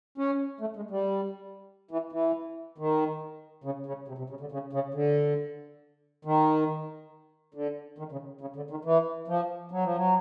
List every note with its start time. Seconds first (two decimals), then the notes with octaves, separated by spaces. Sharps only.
0.18 C#4
0.61 A3
0.76 G#3
0.91 G3
1.91 E3
2.12 E3
2.78 D#3
3.64 C#3
3.86 C#3
4.08 C3
4.18 C3
4.30 C#3
4.41 D3
4.52 C#3
4.73 C#3
4.94 D3
6.25 D#3
7.54 D3
7.98 D#3
8.12 C#3
8.41 C#3
8.56 D3
8.70 D#3
8.85 E3
9.28 F3
9.72 F#3
9.84 F3
9.96 F#3